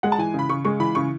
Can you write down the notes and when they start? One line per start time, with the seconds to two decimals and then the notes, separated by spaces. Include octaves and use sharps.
0.03 G#3 F#5
0.12 A5
0.18 E3 G#5
0.34 C#3 B5
0.49 C#3 C#6
0.65 G#3 C#6
0.80 E3 B5
0.95 C#3 C#6